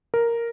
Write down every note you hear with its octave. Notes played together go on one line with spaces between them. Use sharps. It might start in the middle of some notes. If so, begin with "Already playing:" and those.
A#4